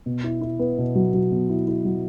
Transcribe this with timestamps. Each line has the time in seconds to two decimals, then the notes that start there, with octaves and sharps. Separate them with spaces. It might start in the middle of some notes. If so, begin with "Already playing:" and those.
0.06 B2
0.24 E4
0.42 E4
0.59 B3
0.78 B2
0.95 F#3
1.14 F#3
1.32 B2
1.49 E4
1.68 E4
1.85 F#3